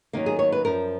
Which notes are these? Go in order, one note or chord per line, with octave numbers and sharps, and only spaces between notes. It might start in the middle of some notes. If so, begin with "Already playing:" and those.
D#2 D#3 F#3 A#3
G#4
C#5
B4
F#2 F3 A#4